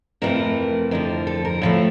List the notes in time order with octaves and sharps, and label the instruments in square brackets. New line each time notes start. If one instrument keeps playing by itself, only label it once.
[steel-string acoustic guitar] F2 C3 E3 A3 A#4
F2 D3 F3 A#4
A4
A#4
A2 F3 A3 C5